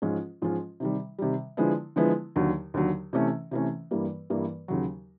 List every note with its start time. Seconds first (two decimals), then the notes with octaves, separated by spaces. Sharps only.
0.02 G#2 F3 G#3 C#4 F4
0.42 G#2 F3 G#3 C#4 F4
0.80 C3 D#3 G3
1.19 C3 D#3 G3
1.57 D3 F3 G#3 B3 E4
1.96 D3 F3 G#3 B3 E4
2.36 D#2 D3 F#3
2.74 D#2 D3 F#3
3.13 C3 E3 A3 C#4
3.51 C3 E3 A3 C#4
3.91 G2 E3 G3 A#3
4.30 G2 E3 G3 A#3
4.68 D#2 C#3 F#3